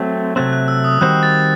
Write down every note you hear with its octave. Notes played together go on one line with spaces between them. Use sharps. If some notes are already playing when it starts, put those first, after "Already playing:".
Already playing: F#3 A3 C4
C3 F#3 A3 C4 F#6
F#6
E6
D#6
D#3 G3 C4 F#4 C5 F#6
A6